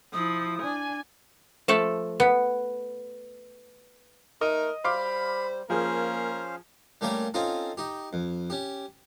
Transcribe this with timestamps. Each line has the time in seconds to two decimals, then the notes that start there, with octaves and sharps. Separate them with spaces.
0.13 F3 E4 D#6
0.62 D4 G#5
1.68 F3 A3 A4
2.20 B3
4.41 A3 D#4 A#4 D#5
4.85 G3 C5 F5 B5 C6 D6
5.70 F3 A#3 C#4 G#4 A#4 C5 F5
7.01 G3 A3 A#3 C#4 G4 C#5
7.34 C4 C#4 D#4 F4 A4
7.77 D#4 G4
8.13 F2
8.50 C#4 G4